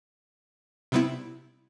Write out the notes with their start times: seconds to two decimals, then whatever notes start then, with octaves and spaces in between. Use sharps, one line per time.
0.92 C3 G3 B3 C4 E4